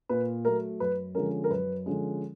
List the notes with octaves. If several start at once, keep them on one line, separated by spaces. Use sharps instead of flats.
A#2 B4
F#3 A3 A#4
F#2 B4
D3 F3 G#3 C#4 A#4
A#4
F#2 B4
D3 F3 G#3 C#4